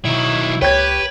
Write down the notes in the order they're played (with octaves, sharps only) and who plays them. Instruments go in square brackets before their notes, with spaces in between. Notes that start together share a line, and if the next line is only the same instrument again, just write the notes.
[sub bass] B2 [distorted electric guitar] D#3 F#3 [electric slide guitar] E4
[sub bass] C#2 [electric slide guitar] G4 [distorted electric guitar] B4 [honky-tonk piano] C#5 G5 G#6